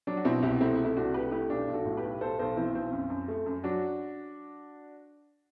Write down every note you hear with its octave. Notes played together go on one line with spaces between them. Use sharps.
F#3 D4
F#4
B2 C4 E4
C2 E4 G4
A3 C4 E4
A3
E4
C2 D4 F#4
A3 G4 B4
A3 E4 G4
B1 D4
B1
F#4 A4
A2
G4 B4
B1
B1 A4 C5
B1 A4 C5
E3 C4 E4
B1 C4
F#2
F#2
A3
F#2
F#3 D4 F#4